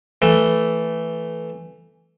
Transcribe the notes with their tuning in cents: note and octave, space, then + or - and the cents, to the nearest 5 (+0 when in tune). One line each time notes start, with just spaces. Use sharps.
E3 +0 A3 +0